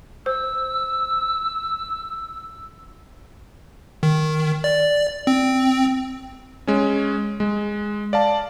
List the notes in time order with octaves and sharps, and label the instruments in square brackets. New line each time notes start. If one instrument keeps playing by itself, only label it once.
[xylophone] C5 [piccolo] E6
[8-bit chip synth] D#3
D5
C4
[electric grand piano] G#3 C#4
G#3
D5 F5 A5